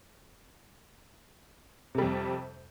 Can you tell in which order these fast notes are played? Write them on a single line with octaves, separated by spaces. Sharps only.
C3 G3 F2